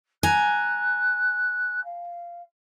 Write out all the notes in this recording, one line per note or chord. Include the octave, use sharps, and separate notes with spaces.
G#5 A#5 F#6
F5